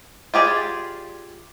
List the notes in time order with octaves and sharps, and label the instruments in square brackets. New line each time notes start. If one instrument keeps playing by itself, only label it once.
[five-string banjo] F4 G4 G#4 D5